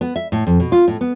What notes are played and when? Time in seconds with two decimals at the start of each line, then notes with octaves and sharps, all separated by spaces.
0.01 B3
0.16 E5
0.32 A2
0.47 F2
0.60 B2
0.72 F4
0.88 A2
1.01 B3